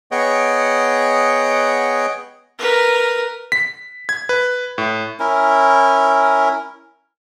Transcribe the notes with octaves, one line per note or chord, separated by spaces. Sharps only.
B3 G#4 C#5 D#5 F#5 G5
A#4 B4
B6
G#6
B4
A2
C#4 E4 A#4